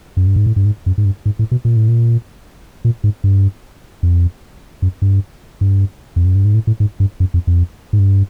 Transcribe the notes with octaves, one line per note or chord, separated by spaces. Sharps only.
F#2
G2
G#2
A2
G2
G#2
F#2
G#2
G2
G#2
A2
B2
A#2
A2
A#2
A#2
G#2
G2
F2
F#2
G2
G2
F2
F#2
G2
G#2
A2
A2
G#2
G2
F#2
F2
F2
G#2
G2